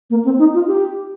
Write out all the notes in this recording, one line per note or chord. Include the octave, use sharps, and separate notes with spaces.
A#3
C4
D#4
F4
G4